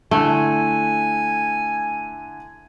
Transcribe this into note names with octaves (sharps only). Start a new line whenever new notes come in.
D3 A3 E4 G#5 F#6